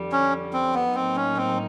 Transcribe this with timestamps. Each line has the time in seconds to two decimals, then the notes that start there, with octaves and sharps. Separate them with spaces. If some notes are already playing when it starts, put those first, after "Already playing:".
Already playing: F2 D3 G3
0.12 C#4
0.53 C4
0.74 B3
0.95 A2 F#3 A#3 C4 D#4
1.16 C#4
1.37 C4